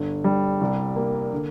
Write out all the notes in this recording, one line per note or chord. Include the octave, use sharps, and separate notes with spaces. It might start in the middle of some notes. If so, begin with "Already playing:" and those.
Already playing: G1
G3
C2
A#3
D3